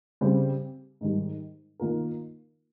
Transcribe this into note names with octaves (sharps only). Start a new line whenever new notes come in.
C#3 G3 C4 G4
G#2 D#3 G3
D#3 A#3 F4 A#4